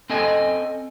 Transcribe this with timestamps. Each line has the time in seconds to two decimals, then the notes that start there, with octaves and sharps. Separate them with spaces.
0.10 C4 C#4 A4 D#5 G#5